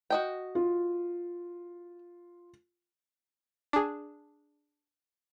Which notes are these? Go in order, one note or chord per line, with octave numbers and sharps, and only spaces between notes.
F#4 D#5 G5
F4
D4 G#4